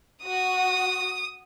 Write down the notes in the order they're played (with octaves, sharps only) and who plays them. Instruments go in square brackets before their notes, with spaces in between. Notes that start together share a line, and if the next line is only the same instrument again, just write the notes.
[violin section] F#4 [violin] D#6